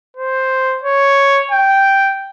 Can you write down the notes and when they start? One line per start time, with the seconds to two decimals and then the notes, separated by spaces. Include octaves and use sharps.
0.17 C5
0.83 C#5
1.51 G5